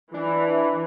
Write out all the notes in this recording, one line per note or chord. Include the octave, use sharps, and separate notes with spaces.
E3 D4